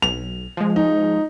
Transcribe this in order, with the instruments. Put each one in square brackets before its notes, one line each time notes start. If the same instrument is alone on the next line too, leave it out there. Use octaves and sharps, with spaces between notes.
[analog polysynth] B1 [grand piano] F7
[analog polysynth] F3 G#3
[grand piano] D#4